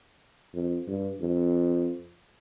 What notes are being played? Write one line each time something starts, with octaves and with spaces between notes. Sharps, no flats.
F2
G2
F2